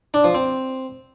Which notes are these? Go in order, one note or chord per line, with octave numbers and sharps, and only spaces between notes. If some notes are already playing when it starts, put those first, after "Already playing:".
D4
F3
C4